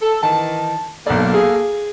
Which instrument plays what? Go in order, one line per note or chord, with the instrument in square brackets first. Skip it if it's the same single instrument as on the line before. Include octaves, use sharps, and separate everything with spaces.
[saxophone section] A4
[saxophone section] D#3 E3 [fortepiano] A5
[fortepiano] B1 D5 [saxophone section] A#3 A4
[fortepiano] G#4 F5